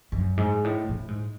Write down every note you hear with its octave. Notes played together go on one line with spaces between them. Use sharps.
F#2
G#2
A2
A2
G#2